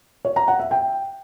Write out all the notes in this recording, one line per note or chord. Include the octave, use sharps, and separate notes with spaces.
C#5
A#5
F#5
E5
G5